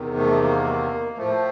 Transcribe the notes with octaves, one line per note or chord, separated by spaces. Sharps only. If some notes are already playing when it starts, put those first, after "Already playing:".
Already playing: E2 C3 D#3
A3
A#3
A#3
A2 F3 A3